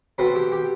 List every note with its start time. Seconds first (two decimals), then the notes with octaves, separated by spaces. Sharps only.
0.18 B2 A3 C4 B4
0.35 G4
0.52 G4